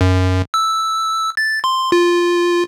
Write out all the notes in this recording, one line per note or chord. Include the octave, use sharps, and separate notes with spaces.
F#2
E6
A6
C6
F4